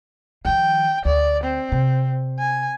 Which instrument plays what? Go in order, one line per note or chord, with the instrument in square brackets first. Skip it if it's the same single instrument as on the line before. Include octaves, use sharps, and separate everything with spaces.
[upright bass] D#3 F3 [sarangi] G5
[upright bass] D2 [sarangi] D5
[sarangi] C4
[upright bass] C3
[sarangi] G#5